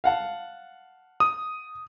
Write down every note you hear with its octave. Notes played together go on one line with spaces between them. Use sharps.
F5 F#5 A5
D#6